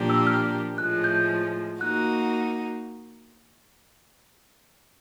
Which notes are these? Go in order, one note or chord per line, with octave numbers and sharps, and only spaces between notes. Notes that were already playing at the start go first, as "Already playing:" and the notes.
Already playing: A#2 F3 A#3 D4 G4
E6
F6
A2 F3 G#3 F#6
G6
A#3 D#4 F#4 F#6